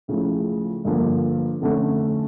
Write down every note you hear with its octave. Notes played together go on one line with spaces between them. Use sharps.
C#2 C#3 F3 A3 E4
G2 D3 F3 A#3
F2 D3 A3 C#4